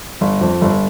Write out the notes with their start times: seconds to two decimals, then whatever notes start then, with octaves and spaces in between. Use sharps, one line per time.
0.21 G1
0.41 F2
0.62 G1